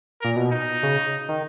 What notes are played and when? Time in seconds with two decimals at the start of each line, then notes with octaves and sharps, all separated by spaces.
0.21 A#2 A#4
0.36 B2
0.51 D#4
0.83 C#3
1.29 D#3